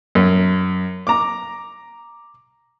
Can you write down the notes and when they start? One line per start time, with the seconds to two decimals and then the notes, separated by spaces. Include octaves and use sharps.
0.15 F#2
1.07 A#5 D6